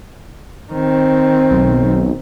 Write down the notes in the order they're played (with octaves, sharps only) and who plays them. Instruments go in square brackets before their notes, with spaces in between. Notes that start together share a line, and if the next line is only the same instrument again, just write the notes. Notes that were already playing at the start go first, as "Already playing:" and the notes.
[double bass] D#3 C4
[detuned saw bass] B1